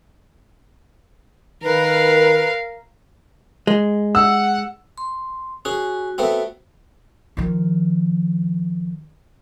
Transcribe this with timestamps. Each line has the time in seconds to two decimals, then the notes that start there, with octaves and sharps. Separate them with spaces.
1.63 D#3 A#4 B4 F5
3.67 G#3
4.15 F#5 E6
4.98 C6
5.65 C#4 F#4 G#4
6.18 A3 B3 C4
7.37 D#3 F3